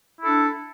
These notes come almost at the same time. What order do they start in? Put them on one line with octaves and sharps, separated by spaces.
E4 A4 D4